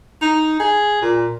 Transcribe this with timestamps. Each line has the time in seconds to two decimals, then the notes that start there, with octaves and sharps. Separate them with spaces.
0.21 D#4
0.59 G#4
1.02 A#2